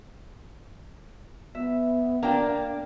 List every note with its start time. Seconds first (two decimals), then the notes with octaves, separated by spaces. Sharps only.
1.55 B3 E5
2.23 A#3 D4 D5 G5 A#5